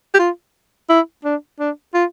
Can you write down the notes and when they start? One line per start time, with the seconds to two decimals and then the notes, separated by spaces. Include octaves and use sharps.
0.14 G4
0.19 F4
0.89 E4
1.24 D4
1.60 D4
1.94 F4